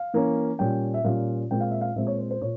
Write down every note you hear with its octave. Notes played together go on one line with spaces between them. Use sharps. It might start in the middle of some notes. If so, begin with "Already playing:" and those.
Already playing: F5
E3 A#3 C#4
A#2 G3 C#4 G5
E5
A#2 G3 C#4 F5
A#2 G#3 C4 G5
F5
E5
F5
A#2 G#3 C4 E5
C#5
C5
C5
A#2 C#5